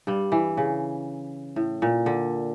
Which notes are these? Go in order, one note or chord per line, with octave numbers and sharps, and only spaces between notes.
G2 G3
E3
C#3
A2
A#2
D3